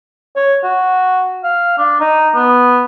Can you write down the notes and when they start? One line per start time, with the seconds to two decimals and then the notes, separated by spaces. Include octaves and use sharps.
0.36 C#5
0.63 F#4
1.44 F5
1.78 D4
2.00 D#4
2.35 B3